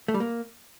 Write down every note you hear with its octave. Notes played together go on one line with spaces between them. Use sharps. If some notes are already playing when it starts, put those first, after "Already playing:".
A3
G3
A#3